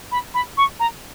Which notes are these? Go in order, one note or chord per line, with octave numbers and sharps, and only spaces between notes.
B5
B5
C#6
A#5